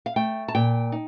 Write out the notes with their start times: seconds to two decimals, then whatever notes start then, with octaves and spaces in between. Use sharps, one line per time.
0.06 F5
0.16 A3 G5
0.48 A5
0.55 A#2 G5
0.92 D#4